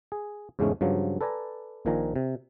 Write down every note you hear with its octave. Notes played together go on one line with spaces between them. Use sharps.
G#4
E2 G#2 C#3 G#3 A3 C#4
G2 C#3 F3 F#3
A4 B4 D5 G#5 A#5
A#1 A#2 D#3 F3 G#5 A#5
C3